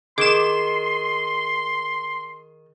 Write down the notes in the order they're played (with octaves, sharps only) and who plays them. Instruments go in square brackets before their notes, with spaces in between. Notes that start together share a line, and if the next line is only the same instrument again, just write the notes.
[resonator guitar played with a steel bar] D#3 [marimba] G#4 [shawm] C6 [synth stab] D6 E7